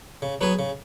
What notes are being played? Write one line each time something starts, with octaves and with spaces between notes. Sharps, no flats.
C#3
F#3 B3 G#4 B4
C#3